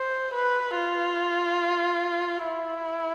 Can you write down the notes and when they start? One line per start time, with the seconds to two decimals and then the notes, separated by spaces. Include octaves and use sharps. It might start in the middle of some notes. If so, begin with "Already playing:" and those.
Already playing: C5
0.34 B4
0.76 F4
2.48 E4